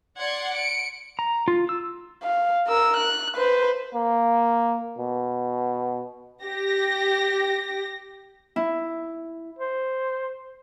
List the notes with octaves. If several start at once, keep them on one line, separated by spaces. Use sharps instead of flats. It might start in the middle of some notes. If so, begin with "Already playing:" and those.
D5 F#5 C6 G#6
C#7 D7
A#5
F4
E6
F5
A#4 E6
F#6
B4 C5
A#3
B2
G4 A#6
E4
C5